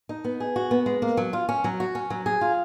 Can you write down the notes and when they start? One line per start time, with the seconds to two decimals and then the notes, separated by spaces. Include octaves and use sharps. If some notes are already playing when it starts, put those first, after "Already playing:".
0.09 D#4
0.25 B3
0.40 G#4
0.56 F#4
0.71 B3
0.86 G#3
1.02 A#3
1.17 F#3
1.33 F4
1.49 C#4
1.64 F#3
1.80 F#4
1.95 C#4
2.10 F#3
2.26 G#4
2.41 F4